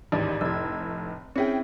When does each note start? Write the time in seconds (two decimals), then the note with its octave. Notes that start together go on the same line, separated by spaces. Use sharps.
0.12 A1 D#2 G#2 G4 D5 G#6
0.41 F1 A2 E6 G#6
1.36 C4 C#4 E4 G#4 E5 G5